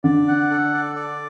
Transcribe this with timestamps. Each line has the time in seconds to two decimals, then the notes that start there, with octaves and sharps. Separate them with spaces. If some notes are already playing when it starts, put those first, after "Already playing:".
0.04 D3 D5
0.28 F#5
0.50 A4
0.74 D5
0.96 D5